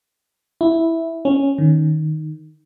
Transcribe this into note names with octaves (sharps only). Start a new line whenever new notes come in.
E4
C#4
D#3